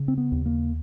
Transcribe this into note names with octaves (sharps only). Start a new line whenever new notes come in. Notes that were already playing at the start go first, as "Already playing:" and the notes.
Already playing: C#3
C4
B3
D#2
A#3